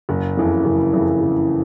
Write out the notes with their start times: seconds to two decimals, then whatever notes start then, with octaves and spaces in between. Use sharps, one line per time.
0.09 F#1
0.37 F2 C#3 E3
0.65 F#1
0.93 F2 C#3 E3
1.21 F#1